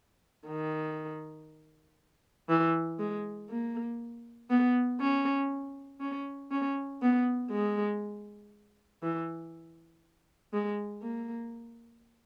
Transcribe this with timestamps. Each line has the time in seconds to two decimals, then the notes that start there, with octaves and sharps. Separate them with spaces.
0.48 D#3
2.49 E3
2.99 G#3
3.50 A#3
4.50 B3
5.00 C#4
6.00 C#4
6.51 C#4
7.02 B3
7.52 G#3
9.03 E3
10.53 G#3
11.03 A#3